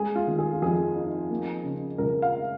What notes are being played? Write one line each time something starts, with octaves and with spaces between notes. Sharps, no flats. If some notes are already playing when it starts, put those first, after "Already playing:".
Already playing: G#3 G#4
F4
D#3
G#4
F4
F2 G#4
D#4
A#3
C#3
C#2 A#4
F5